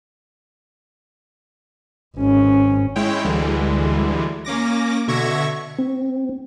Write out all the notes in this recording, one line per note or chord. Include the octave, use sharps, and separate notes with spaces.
G#1 C#4
G#3 E4 C#5 G5
D2 D3 E3 G3 G#3
A#3 C#4 D6 A#6
B2 D3 E5 C#6 G#6 A#6
C4